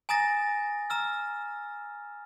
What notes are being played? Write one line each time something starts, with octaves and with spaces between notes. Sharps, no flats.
G#5 A#5 D#6 A6 A#6
A#5 E6 F6